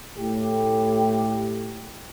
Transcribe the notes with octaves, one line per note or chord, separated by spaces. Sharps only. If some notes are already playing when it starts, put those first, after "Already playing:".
A2 G4